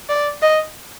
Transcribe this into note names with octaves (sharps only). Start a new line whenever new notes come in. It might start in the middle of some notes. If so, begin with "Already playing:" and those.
D5
D#5